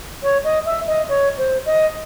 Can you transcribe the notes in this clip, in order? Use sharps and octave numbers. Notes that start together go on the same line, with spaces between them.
C#5
D#5
E5
D#5
C#5
C5
D#5